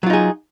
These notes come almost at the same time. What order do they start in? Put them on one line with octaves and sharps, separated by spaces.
F#3 F4 D#4 G#4